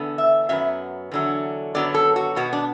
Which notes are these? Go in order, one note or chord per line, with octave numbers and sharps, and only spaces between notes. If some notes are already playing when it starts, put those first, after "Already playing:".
Already playing: E2 D3 B3
E5
F#2 F#3 B3 E5
E2 D3 F#3
F#2 D3 F#3 B3 D5
A4
F#4
B2 B3 F#4
D4